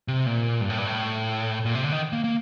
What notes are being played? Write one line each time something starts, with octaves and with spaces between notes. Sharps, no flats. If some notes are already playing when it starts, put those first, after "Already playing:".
C3
A#2
G2
A2
G2
A2
A#2
C3
D3
D#3
A#3
A#3